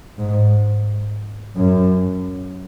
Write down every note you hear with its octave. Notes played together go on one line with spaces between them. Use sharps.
G#2
F#2